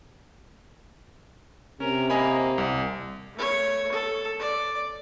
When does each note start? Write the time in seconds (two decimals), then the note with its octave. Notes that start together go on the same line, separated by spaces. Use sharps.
1.80 C3 C#4 A#4
2.10 A#3 D#5 G#5 B5
2.58 C2
3.34 A3 C#5
3.92 A4
4.39 D5